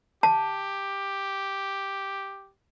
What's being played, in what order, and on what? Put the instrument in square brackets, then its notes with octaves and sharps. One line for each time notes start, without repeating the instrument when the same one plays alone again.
[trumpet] G4 [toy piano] A5